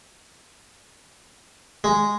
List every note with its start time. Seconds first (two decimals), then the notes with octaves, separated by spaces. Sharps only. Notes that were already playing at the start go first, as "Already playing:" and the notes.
1.84 G#3